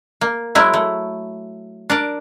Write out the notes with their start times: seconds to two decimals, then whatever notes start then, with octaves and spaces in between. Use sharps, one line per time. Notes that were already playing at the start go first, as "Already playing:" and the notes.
0.21 A#3
0.55 F#3 G#3 E4 A#4
0.74 A3
1.90 D4 A#4 D5